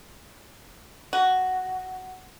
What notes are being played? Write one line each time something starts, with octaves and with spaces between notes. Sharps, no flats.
F#4